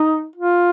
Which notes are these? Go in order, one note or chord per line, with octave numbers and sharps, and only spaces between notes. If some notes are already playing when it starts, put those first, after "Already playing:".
Already playing: D#4
F4